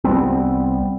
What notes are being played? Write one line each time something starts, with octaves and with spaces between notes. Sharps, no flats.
C2 G3 B3 C4